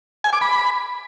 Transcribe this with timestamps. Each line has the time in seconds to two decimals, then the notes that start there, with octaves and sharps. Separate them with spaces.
0.24 G#5
0.33 D6
0.41 B5